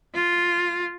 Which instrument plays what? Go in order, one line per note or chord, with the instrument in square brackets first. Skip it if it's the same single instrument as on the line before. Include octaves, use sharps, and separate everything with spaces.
[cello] F4